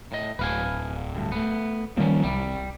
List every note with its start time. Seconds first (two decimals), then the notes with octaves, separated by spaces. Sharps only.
0.12 A2 D#5
0.39 D1 B4 F5 G#5
1.16 D2 G2
1.32 A3 B3
1.98 D#3 F3 G3 A#3 C#4
2.23 C2 G3